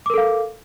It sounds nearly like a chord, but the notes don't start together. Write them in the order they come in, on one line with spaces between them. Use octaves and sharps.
D6 A#4 A4 F5